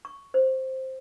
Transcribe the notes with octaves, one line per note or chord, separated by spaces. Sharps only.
C#6
C5